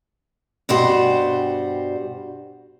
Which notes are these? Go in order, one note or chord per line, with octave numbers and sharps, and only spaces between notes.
G2 B2 G3 F#4 C5